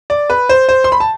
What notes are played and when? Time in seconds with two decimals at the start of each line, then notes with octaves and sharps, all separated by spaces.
0.10 D5
0.30 B4
0.49 C5
0.69 C5
0.84 C6
0.92 B5
1.00 A5